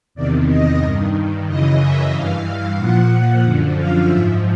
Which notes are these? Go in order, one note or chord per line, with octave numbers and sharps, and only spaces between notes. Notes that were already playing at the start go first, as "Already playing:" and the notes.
E2 C3 D#3 D5
D#5
G2 D#3
F#2 C#3 E3 D#5
E5
G2 E3 F5
F5
A#2 F3 F#5
F#5
F#2 D3 F3
F5
G#2 F3 E5